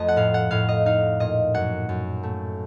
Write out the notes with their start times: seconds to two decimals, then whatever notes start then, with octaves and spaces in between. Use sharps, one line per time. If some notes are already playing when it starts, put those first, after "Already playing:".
Already playing: F2 A3 D#5
0.08 F#5
0.16 A2 F5
0.34 F#5
0.51 A2 F5
0.69 D#5
0.86 D#4 F5
1.20 A#2 D#5
1.54 F#2 F#5
1.89 F#2
2.23 A3